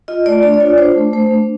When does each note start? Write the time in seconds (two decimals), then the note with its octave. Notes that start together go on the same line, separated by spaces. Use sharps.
0.08 F4 D#5
0.26 A3 D5
0.43 D4 D5
0.54 D5
0.60 F4 C#5
0.78 D4 C5
0.96 A3
1.13 A3 C5
1.31 D4